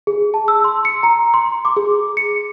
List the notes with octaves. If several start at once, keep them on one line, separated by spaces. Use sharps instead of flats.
G#4
A5
E6
C6
C#7
A#5
C6
D6
G#4
C#7